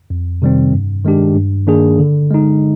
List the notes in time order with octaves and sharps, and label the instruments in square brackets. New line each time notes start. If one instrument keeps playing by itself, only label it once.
[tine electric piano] F2
C3 D#3 G3 C4
G2
D#3 G#3 D4 G4
G2
D#3 A#3 D4 G#4
D3
G#3 D#4